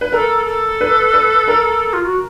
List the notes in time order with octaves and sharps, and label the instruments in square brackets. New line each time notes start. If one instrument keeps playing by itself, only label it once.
[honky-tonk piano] B4
[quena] A4 [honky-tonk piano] A#4
[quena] A4
[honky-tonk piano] B4
B4
A#4
[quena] F4
F#4